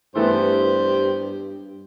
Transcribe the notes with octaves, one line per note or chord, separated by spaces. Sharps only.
G2 E3 A3 B3 G4 C5